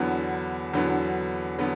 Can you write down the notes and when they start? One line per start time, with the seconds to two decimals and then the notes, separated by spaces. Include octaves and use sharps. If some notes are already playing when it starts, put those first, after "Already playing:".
Already playing: E2 D3 F#3 B3
0.74 E2 D3 F#3 B3
1.59 D3 F#3 B3